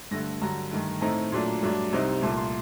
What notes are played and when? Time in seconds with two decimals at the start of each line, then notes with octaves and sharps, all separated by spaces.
0.11 G2 D3 A3 A#6
0.41 G2 D3 F#3 A#5
0.71 G2 D#3 A3
1.01 A2 A3 C4 D#4 A#5
1.32 A#2 F#3 A3 D4
1.63 G2 F#3 A3 D4
1.93 C2 C3 G3 C4 D#4
2.22 C2 A#2 A3 A5
2.37 C6